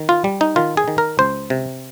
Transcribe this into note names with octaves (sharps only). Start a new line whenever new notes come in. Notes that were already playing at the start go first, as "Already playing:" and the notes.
Already playing: D#3
F4
G3
D#4
D#3 F4
G#4
D#3
A#4
C#2 C5
C3